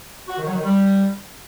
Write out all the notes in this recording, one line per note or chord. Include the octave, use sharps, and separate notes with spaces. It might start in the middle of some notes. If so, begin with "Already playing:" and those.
F#4
D#3
F#3
D#3
G3